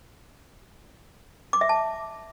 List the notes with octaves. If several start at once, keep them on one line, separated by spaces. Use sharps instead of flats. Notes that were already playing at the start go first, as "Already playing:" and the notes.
D6
E5
A5